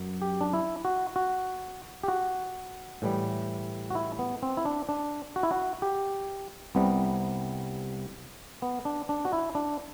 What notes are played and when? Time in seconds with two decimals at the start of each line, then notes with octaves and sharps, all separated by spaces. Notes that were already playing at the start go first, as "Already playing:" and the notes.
Already playing: F#2 F#3
0.22 G4
0.41 D4
0.54 E4
0.85 F#4
1.16 F#4
2.03 G4
2.08 F#4
3.02 A2 E3 G3
3.90 F#4
3.95 E4
4.19 B3
4.43 C4
4.57 E4
4.65 D4
4.89 D4
5.36 F#4
5.43 E4
5.51 F#4
5.82 G4
6.75 C2 C3 G3 B3
8.62 B3
8.85 D4
9.09 D4
9.25 F#4
9.33 E4
9.55 D4